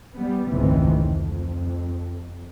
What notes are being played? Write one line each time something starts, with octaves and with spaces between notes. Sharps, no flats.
G3 B3
F1 C#2 G#2 D#3 E3 C4
F2